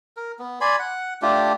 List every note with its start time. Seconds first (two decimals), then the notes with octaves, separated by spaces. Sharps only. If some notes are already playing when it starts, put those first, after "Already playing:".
0.17 A#4
0.39 B3
0.61 D5 G#5 B5 C6
0.79 F#5
1.22 A3 D4 F4 G4